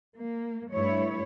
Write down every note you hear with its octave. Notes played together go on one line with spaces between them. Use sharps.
A#3
G2 A3 E4 C#5